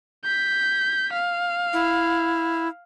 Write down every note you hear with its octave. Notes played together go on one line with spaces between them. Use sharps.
G6 B6
F5
E4